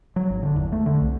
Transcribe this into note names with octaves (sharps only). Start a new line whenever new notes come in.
F#3
G#1
D3
E2
A3
D3
C2